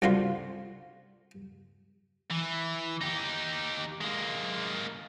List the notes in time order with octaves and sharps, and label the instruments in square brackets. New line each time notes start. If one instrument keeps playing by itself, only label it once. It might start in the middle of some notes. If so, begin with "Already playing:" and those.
[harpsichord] C2 D3 G3 F4 F#4 C6
[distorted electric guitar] E3
D#4 G4
G#3 A#3